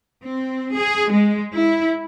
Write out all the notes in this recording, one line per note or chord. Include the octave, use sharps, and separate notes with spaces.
C4
G#4
G#3
E4